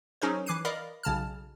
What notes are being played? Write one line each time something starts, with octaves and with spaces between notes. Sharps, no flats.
F#3 C#4 D#4 G#4 A#4 C5
E3 D6 F#6 C7 D#7
A#4 D5 D#5 F5 B5
B1 C#3 A5 F6